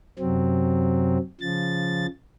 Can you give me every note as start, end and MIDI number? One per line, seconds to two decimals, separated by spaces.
0.19 1.18 42
0.19 1.18 48
0.19 1.18 54
0.19 1.18 60
1.41 2.07 49
1.41 2.07 53
1.41 2.07 93